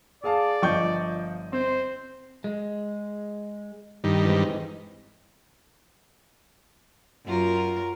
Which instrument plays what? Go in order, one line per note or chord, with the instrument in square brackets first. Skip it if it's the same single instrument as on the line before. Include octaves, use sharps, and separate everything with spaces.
[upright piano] G#4 F5 A5 [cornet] D5
[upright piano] G1 D#5 G5 [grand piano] F3 C#6 G6
[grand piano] C4 [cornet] C5
[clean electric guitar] G#3
[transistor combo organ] G2 D#3
[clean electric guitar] E3 G#3 C4
[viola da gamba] F#2 F4 A#4